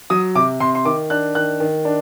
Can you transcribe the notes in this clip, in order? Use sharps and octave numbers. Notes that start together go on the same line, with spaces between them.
F#3 D#6
C3 D6
C3 C6
C6
D#3 D6
D4 F#6
D#3 F#6
D#3
D4